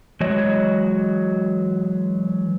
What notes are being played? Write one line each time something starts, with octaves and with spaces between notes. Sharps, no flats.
E3 F#3 G#3 F#4 C#5 D#5